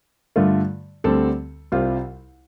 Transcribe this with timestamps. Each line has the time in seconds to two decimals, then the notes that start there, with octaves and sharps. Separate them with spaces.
0.36 G2 D3 A3 F4
1.04 D2 D3 G3 C4 A4
1.72 C2 C3 G3 F4 C5